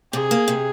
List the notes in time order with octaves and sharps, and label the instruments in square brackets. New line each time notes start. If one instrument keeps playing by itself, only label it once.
[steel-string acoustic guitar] C3 [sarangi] G#4
[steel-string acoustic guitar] A#3
C3